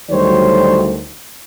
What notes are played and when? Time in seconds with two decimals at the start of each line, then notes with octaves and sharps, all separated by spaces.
0.10 D2 D#3 F#3 G3 C5 C#5